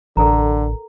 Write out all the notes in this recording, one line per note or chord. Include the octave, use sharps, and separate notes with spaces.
A1 D3 A4 A#4 A#5